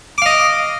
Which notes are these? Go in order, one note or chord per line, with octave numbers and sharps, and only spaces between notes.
D#5 F5 D6